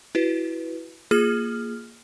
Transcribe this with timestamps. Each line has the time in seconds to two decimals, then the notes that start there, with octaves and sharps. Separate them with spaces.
0.15 E4 F#4 B4
1.11 A#3 F4 G#4 F6